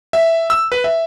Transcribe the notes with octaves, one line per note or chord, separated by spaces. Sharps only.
E5
E6
B4
E5